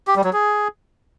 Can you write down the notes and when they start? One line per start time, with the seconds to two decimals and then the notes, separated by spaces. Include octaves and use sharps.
0.07 G4
0.16 G3
0.24 F#3
0.33 G#4